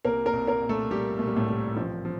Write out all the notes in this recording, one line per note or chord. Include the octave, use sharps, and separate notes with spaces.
C2 A#3 A#4
A#3 A#4
C2
A#3 A#4
A#2
A3 A4
A#2 G3 G4
A#2 A3
G3
A2 A3
C2 G3
A1 F3
F3